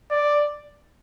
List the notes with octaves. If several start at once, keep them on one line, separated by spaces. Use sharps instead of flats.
D5